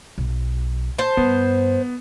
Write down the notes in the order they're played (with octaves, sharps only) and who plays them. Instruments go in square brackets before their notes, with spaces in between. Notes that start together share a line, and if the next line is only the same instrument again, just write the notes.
[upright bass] B1
[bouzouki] C5 A5
[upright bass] G2 [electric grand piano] B3